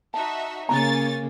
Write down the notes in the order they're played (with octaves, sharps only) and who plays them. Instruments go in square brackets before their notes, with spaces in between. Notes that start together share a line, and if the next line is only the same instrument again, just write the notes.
[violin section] D#4 F#4 E5 [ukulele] A5
[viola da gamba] C#3 A#3 [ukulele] C#4 D4 A#5 [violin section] C#5 G#5 A6